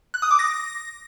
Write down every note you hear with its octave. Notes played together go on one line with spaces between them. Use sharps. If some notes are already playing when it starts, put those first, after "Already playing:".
F#6
D#6
D6
A#6